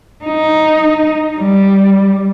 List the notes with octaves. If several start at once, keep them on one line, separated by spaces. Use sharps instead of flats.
D#4
G3